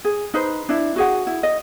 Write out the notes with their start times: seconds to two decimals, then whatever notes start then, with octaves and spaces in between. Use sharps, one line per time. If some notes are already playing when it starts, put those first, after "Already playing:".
0.05 G#4
0.34 D#4 B4 C5
0.69 D4 E4
0.96 F#4 G#4 F#5
1.27 E4
1.43 D#5